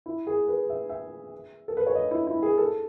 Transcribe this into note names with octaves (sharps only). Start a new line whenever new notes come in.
E4
G#4
B4
E5
E5
A4
B4
C#5
D#5
E4
E4
G#4
A4